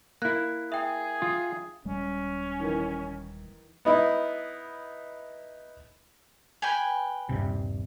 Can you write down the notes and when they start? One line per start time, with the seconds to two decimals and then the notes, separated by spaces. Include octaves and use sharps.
0.22 A#3 E4 F#6
0.72 G#4 E5 G5
1.22 F4
1.85 D#1 G3 G#3 C#4
2.60 D#3 E3
3.85 B3 D#4 E4
6.62 B4 G5 G#5
7.29 D#1 G2 C3